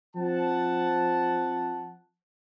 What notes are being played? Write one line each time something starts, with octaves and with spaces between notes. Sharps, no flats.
F3 C4 F#5 A5